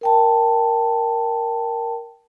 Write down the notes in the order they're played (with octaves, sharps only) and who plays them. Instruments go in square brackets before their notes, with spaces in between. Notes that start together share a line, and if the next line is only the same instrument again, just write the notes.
[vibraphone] A#4 G5 A5